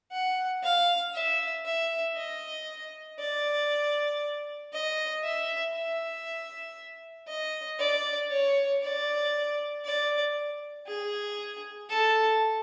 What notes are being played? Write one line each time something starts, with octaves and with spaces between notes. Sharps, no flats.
F#5
F5
E5
E5
D#5
D5
D#5
E5
E5
D#5
D5
C#5
D5
D5
G#4
A4